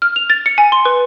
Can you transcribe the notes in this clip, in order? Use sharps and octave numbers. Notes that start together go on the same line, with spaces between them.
F6
F7
A6
C#7
G#5
C6
B4